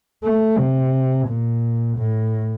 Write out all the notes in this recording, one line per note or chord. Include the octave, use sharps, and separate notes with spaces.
A3
C3
A#2
A2